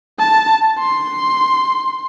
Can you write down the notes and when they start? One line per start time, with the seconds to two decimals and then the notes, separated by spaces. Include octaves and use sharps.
0.19 A5
0.79 C6